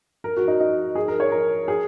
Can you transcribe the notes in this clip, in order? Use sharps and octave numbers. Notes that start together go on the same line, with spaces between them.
A#4
F#4
D#4
D#4
G#4
A#4
C#5
A#4
G#4